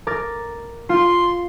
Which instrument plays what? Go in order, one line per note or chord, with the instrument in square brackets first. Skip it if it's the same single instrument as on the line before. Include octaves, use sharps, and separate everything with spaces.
[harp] A#4 D6 A6
[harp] F4 [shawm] C6